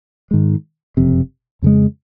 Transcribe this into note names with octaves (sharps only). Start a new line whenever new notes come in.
G#2 D#3 G#3
F#1 F2 C3
F2 C#3 G#3